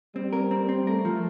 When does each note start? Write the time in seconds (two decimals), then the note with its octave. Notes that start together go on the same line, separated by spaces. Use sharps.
0.16 G3 C4
0.33 A#4
0.51 C4
0.69 C4
0.87 A3 A#4
1.05 F3